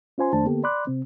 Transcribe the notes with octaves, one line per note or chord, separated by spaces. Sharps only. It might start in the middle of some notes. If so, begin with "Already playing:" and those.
C#4 F4 C5 G#5 C6
F2 D#3 A3 D4 C5 A5
D3 A#3 B3 G4 A4
D5 B5 C6 D6 F#6
C3 C4